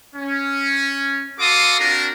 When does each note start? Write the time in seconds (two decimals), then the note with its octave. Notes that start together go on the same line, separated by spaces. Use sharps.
0.15 C#4
1.39 F#4 A4 F5 C6 D6 D#6
1.79 C4 D4 F4 F#4 A#4